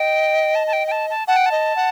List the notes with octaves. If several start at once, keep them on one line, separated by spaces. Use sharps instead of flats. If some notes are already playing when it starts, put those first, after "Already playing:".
Already playing: D#5 G5
A5
A5
G5
G5
A5
A5
F#5 A5
G5
A5
D#5
F#5